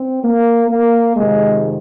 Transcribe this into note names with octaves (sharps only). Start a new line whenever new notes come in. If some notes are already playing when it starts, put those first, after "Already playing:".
Already playing: C4
A#3
A#3
F2 C3 D#3 G#3